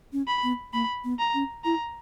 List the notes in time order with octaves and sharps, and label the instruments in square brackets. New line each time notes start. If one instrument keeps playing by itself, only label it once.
[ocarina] C#4
[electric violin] B5
[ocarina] B3
[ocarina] A#3 [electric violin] B5
[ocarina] B3
[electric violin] A#5
[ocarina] C#4
[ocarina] E4 [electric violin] A#5